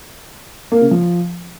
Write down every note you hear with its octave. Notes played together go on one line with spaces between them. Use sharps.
A#3
C#3
F3